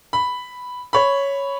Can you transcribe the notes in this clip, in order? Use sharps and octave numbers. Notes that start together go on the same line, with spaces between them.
B5
C#5 B5